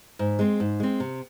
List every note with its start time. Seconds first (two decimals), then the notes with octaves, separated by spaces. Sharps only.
0.19 G#2
0.39 G#3 C4
0.60 G#2
0.80 G#3 C4
1.00 C3